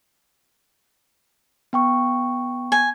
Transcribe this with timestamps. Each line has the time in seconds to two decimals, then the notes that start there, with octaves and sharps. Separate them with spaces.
1.73 B3 G5 C#6
2.72 G#5